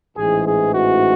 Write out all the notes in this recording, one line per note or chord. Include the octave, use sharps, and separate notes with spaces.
A1 G#2 E3 G#4
G#4
F#4